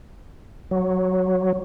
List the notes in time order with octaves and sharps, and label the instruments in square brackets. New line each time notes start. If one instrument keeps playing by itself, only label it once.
[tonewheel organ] F#3